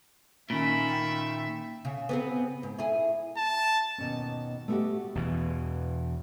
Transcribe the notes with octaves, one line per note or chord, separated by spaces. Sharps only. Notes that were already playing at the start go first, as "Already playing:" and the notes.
A#2 D#3 A3 C#4 F4 E5 B5
G5
C#3
B3 C4 G#4
G#2
E4 G#4
A5
D#2 B2 C#4
A3 B3 D#4 E4 F#4 G4
E2 B2 E3